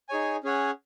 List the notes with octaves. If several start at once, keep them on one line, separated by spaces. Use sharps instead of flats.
D#4 G#4 C#5 G#5
C#4 G#4 C#5 F#5